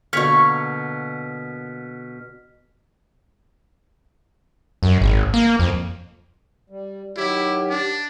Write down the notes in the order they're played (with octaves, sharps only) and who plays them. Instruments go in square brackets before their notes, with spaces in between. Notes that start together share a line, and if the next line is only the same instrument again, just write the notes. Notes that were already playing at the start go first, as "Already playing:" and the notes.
[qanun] B2 D3 A#3 [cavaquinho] C#5 C#6 [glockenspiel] F6 B6
[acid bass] F#2
G#1
A#3
F2
[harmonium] G3
[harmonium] D#3 F#3 [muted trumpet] E4 [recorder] G4
[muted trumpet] D4